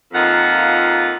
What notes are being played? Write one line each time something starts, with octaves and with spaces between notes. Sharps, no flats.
F2 A#3 D#4 F4 F#5